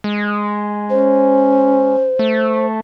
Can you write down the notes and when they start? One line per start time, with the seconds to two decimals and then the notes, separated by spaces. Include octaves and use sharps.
0.04 G#3
0.90 C#4 C5
2.19 A3